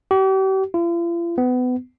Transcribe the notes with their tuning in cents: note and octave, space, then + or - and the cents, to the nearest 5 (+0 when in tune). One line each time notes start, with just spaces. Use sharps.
G4 -40
F4 -45
B3 +25